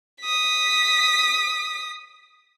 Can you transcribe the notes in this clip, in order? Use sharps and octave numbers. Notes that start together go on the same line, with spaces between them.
D#6 B6